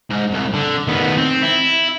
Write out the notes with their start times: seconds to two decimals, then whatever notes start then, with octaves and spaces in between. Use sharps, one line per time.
0.11 G#2
0.31 C2
0.54 D3
0.88 D#3 B3
1.18 C4
1.43 E4